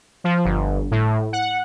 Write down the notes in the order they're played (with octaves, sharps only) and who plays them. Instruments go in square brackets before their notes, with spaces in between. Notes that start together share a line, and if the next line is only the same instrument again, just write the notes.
[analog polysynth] F3
G1
A2
F#5